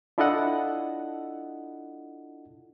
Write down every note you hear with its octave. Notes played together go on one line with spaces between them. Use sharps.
D4 E4 F4 A4 D#5 F#5